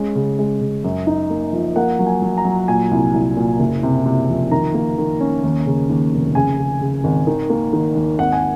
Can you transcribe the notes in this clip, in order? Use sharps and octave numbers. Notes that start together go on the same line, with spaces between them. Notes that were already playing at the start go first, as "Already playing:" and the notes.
Already playing: G#3 C#4
C#3
G#3
C#3
F#2
D#4
A#3
F3
A#3 F#5
F#3
G#5
F#3
A#5
F#3
A#2 G#5
C2
C2
A#2
F#1
C3
C3
F2
D#3 A#5
A#3
D#3
C#4
D#2
C#3
D#2
F1
C#3 G#5
C#3
C#3
G#1
D#3
A#3
D#3
D#2
G#1 F#5
G#5